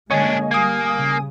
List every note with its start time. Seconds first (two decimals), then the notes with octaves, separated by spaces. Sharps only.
0.11 D3 G#3 A#3 C#4 D4 C#5 D#5 G#5
0.51 G3 A#3 G#5 D#6
0.94 C#3